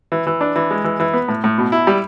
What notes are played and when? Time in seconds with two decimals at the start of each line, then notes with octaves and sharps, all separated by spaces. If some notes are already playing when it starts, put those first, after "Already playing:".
0.12 E3
0.27 E3
0.41 D4
0.56 E3
0.70 G#3
0.84 E3
1.00 E3
1.13 B3
1.28 A2
1.44 A2
1.58 B2
1.72 E4
1.87 G3